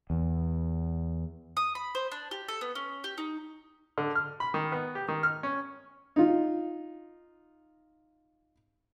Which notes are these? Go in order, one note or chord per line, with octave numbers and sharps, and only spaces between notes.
E2
D#6
B5
C5
D4
G4
A4
B3
C#4
G4
D#4
D3
F6
B5
D#3
B3
G4
D#3
F6
C#4
D#4 F4